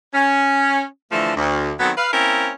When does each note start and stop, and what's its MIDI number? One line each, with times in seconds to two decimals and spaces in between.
0.14 0.84 61
1.12 1.34 50
1.12 1.34 52
1.12 1.34 53
1.12 1.34 57
1.36 1.72 38
1.80 1.91 51
1.80 1.91 54
1.80 1.91 59
1.80 1.91 60
1.80 1.91 69
1.98 2.08 71
1.98 2.08 77
2.13 2.51 58
2.13 2.51 60
2.13 2.51 61
2.13 2.51 64
2.13 2.51 70